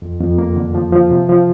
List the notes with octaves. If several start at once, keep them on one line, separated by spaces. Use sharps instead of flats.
F2
F2
A#3
D3
F3
F3
C3
F3